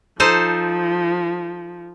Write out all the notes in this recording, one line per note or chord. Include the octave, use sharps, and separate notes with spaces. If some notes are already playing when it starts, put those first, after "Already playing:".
F3 D#4 A4 C5